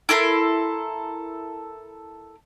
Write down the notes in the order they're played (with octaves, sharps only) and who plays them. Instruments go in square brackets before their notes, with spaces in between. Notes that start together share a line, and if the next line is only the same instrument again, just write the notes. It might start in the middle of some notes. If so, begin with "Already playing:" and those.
[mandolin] E4 A4 A#4 C6